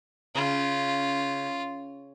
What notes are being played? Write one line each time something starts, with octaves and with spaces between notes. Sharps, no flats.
C#3 F4